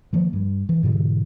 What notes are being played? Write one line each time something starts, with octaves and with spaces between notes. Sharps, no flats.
D#3 F3 A#3
G2
E3
G#2 B2 D3 E3